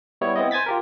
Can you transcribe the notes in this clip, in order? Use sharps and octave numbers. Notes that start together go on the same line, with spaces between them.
G3 B3 E4 C#5
B3 C4 E4 D#5
C5 G#5 G#6 A6 B6
F4 G4 A#4